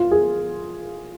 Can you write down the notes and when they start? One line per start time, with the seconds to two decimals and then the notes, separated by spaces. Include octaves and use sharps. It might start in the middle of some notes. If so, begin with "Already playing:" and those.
Already playing: F4
0.11 G#4